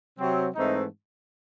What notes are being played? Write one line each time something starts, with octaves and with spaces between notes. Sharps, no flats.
C3 F#3 C4
G#2 E3 A3 C4 D#4